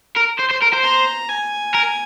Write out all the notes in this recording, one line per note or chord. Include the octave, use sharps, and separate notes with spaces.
A#4
C5
C5
A#4
C5
A#5
G#5
A#4